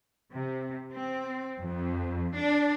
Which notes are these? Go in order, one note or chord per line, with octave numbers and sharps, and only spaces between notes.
C3
C4
F2
D4